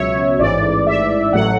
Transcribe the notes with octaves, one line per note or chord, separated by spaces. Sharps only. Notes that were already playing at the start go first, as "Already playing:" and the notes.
Already playing: C#2 B2 F#3 C#5 E5
A1 G#2 E3 D5
E5
A1 A2 F#3 F#5